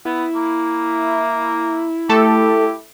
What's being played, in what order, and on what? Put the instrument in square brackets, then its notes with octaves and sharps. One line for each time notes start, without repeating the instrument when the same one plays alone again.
[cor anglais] B3 [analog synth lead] E4
[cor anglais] A#3
[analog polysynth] A3 A4 [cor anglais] G4